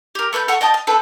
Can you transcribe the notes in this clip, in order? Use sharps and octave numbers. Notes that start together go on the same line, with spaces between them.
G4 A#4
A3 B4 F#6 G6
A4 F#5 C#6 D#6
D#5 G5 A5 D#6
D#5
C4 A4 B4 A5